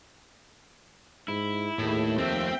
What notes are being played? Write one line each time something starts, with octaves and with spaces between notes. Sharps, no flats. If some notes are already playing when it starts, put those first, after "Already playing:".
G#2 E4
D#2 A2 A3 G#4
F2 A3 C4 E5 G5